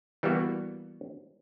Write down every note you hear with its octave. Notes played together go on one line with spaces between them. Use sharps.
E3 G3 A#3 B3 F#4